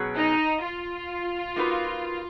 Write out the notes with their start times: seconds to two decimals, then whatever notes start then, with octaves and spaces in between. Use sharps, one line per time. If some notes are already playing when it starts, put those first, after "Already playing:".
Already playing: B2 F#3 C#4 G#4
0.15 D#4
0.62 F4
1.56 A#3 D#4 F#4 B4